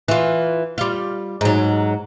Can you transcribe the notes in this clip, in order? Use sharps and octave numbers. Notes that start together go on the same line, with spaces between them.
E3 F4
G3 F4
G#2 F#3